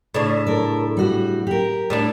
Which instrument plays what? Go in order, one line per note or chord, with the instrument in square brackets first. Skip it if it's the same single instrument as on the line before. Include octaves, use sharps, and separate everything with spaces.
[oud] A2 C#3 D4
[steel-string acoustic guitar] A4 A#4
G3 F#4
G4 A#4
[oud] A2 G3 D4